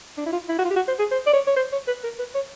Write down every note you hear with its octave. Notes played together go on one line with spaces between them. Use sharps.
D4
E4
F4
E4
F#4
F4
G4
F#4
C5
G#4
C5
D5
C#5
C#5
C5
C#5
B4
A#4
B4
C#5